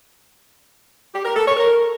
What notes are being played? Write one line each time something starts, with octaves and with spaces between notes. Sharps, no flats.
G4
A#4
A4
C#5
A#4